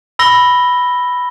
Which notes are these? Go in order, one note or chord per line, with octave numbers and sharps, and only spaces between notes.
B5 E6 A#6 G7